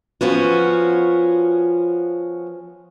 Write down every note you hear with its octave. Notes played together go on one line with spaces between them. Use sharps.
F3 B3 C#4 F#4